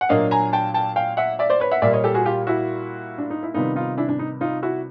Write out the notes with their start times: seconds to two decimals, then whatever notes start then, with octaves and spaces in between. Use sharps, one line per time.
0.01 F#5
0.09 A#2 F#3 A#3 D4 D#5 F5
0.31 G#5 A#5
0.53 G5 A5
0.74 G5 A5
0.96 F5 G5
1.17 E5 F#5
1.39 D5 E5
1.50 C5 D5
1.60 B4 C#5
1.71 E5 F#5
1.82 A#2 G3 A#3 D5 E5
1.93 C#5 D#5
2.04 G4 A4
2.14 F#4 G#4
2.25 F4 G4
2.47 E4 F#4
3.18 D4
3.30 D#4
3.43 E4
3.54 C3 D#3 G3 B3 D#4 F4
3.76 D#4 F4
3.97 D4 E4
4.09 D4
4.19 D#4
4.41 D#4 F4
4.63 E4 F#4